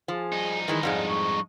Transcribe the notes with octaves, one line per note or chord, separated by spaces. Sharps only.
F3 G#4
G2 D#4
D#3 E3 G#3
F2 G#2 G#3 D5
C#6